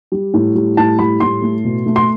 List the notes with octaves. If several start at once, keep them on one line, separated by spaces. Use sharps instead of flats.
G3
A2
G3
A2 A5
G3 B5
A2 C6
A3
B2
A3
C6